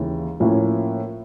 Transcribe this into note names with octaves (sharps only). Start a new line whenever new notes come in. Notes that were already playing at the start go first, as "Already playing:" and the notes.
Already playing: D#2 C#3 E3 G#3
A2 F3 A#3 C#4